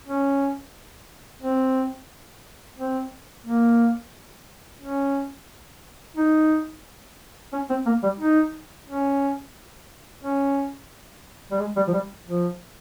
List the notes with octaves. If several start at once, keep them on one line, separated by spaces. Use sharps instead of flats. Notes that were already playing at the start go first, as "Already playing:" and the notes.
C#4
C4
C4
A#3
C#4
D#4
C#4
C4
A#3
G3
D#4
C#4
C#4
G3
G#3
G3
F3
G3
F3